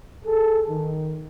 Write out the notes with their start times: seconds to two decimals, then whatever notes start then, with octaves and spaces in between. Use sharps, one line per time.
0.24 G#4 A4
0.69 D#3